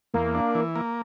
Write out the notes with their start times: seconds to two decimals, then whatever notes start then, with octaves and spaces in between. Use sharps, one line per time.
0.14 E2 A#3
0.35 D4
0.55 E3
0.76 A#3